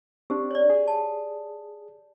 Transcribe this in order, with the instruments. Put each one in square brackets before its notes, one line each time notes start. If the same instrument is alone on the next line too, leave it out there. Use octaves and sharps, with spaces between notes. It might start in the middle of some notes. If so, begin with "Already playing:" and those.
[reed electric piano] C4 D4 [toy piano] G4
[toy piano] C#5 D5
[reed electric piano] G#4
[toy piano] A5